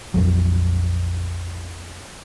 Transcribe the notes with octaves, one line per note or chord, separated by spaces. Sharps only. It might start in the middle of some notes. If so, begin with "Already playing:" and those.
A#1 F2 F#3